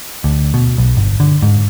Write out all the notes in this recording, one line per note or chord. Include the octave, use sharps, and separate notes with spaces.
D2
B2
B1
G1
D3
G#2